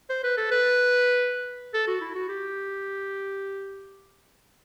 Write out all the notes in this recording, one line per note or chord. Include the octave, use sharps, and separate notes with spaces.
C5
B4
A4
B4
A4
F#4
E4
F#4
G4